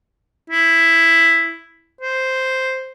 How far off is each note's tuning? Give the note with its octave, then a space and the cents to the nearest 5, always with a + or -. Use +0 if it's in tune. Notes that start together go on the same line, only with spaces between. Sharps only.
E4 +5
C5 +0